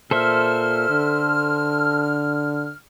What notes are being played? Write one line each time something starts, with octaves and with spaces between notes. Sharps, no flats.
A#2 A4 C5 E5 F6
D3